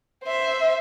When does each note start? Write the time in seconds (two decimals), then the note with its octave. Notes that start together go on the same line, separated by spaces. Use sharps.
0.24 C5 E5